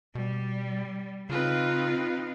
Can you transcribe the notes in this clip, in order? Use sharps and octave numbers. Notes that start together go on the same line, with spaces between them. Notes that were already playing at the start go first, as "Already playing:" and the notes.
B2 G3
C#3 C4 D#4 F4 B4